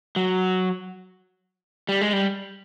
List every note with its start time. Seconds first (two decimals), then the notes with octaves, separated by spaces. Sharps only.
0.16 F#3
1.89 G3
2.01 G#3
2.13 G3